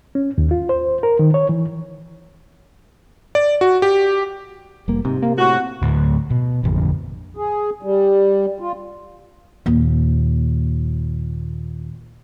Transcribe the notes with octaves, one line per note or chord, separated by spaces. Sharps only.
C#4
D#2
F4
C5
A#4
D#3
C#5
E3
D5
F#4
G4
F1 G3 A#3
G#2 C3
A#3
A2 F#4
D2 A2
B2
A1 F2 D3
G#4
G3
F4
D#2 A#2